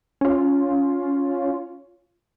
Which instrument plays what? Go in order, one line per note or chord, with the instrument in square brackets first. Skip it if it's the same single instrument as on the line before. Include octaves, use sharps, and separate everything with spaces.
[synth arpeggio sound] C#4 F4